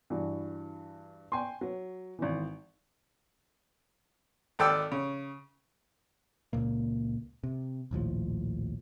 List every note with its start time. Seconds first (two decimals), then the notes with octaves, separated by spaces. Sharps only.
0.10 G2 E3 F#4
1.32 G5 G#5 C6
1.61 F#3
2.19 G#1 E3
4.59 G#1 A4 D5 G5 E6 F6
4.92 C#3
6.53 C#2 A#2 A#3
7.44 C3
7.91 A#1 D#2 A2 F3